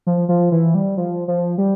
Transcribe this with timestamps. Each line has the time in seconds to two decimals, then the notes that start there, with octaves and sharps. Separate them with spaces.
0.07 F3
0.29 F3
0.52 E3
0.75 G3
0.97 F3
1.28 F3
1.58 G3